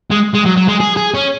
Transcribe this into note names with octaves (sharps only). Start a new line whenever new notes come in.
G#3
G#3
F#3
F#3
G#3
G#4
G#4
C#4